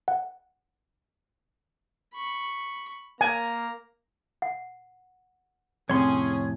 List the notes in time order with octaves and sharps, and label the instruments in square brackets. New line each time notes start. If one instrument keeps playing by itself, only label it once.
[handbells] F#5
[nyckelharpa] B5 C#6
[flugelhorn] A#3 [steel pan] G#5 [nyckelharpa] A#5
[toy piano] F#5
[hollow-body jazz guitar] F2 A2 C3 [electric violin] C#4 G#4 [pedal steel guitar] C#5 C6